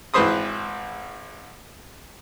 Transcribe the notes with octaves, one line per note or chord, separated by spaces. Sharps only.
G#1 E3 B4 C5 C6 D#6